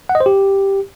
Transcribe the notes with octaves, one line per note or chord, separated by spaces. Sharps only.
F#5
D#5
C5
G4